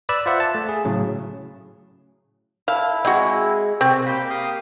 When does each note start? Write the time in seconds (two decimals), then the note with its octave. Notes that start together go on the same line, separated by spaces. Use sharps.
0.09 B4 D5 B5 E6
0.26 F4 C5 E5 F#5
0.40 A5
0.55 A3
0.69 G#4
0.85 A2 C#3 F#3
2.68 E4 A4 F5
3.05 G#3 C4 F#4
3.81 C3 C4 F#4
4.06 A#3 G4 B5
4.30 F5 D#6